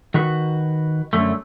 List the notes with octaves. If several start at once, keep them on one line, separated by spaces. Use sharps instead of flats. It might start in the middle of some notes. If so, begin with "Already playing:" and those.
D#3 F#4 B4
F#2 D3 A3